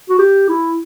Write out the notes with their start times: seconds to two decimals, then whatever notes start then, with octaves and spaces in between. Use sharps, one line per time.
0.09 F#4
0.19 G4
0.49 E4